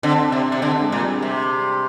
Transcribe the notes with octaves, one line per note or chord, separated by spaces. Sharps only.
D3 C4
D4
C3
D4
C3
D3 C4
G#3
A#2
G3
C3